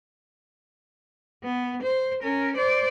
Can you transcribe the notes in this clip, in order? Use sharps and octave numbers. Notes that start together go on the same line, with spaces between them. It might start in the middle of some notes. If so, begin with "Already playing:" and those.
B3
C5
C#4 A#4
C5 D5